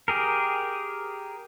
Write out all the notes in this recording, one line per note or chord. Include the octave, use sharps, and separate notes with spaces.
G4 G#4 A#4